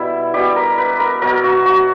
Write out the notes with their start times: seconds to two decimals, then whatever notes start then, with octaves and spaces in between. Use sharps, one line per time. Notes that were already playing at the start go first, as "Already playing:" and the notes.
Already playing: B2 G3 E4
0.34 B2 G3 G4
0.56 A#4
0.78 B4
1.00 A#4
1.22 B2 F#3 A#4
1.44 F#4
1.66 F#4